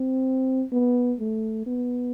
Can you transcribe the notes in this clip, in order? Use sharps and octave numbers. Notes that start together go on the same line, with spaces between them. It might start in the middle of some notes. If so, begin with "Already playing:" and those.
Already playing: C4
B3
A3
B3